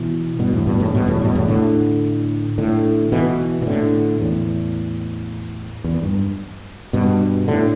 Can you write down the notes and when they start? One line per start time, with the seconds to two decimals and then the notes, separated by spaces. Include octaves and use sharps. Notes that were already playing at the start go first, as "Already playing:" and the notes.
Already playing: B2 E3
0.39 G2 B2
0.53 E2 A2
0.67 G2 B2
0.80 E2 A2
0.94 G2 B2
1.08 E2 A2
1.22 G2 B2
1.35 E2 A2
1.48 A2 D3
2.58 A2 D3
3.12 B2 E3
3.62 B2
3.66 A2 D3
4.21 E2 A2
5.84 E2
6.03 G2
6.93 G2 B2
7.48 A2 D3